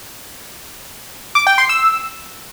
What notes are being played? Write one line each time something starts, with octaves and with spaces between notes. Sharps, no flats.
D6
G5
C6
E6